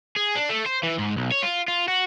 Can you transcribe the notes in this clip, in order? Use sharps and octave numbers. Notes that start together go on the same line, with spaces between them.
G#4
D4
A3
C5
E3
G#2
B1
C#5
F4
F4
F#4